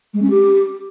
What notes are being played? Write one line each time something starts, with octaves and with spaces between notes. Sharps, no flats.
G#3
C#4
G4